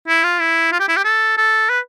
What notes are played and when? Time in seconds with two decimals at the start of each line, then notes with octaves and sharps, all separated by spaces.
0.08 E4
0.24 F4
0.40 E4
0.72 F4
0.80 G4
0.88 E4
0.97 G4
1.04 A4
1.37 A4
1.70 B4